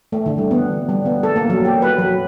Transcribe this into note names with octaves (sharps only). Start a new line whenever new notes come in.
A3
D3
G3
B3
G3
B3
A4
A#3
F#3
G4
B4
F#3